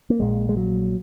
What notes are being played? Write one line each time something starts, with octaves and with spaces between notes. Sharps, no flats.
A#3
A#1 A#2 G#3
G#3
F#3